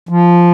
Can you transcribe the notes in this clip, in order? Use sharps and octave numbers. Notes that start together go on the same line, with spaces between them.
F3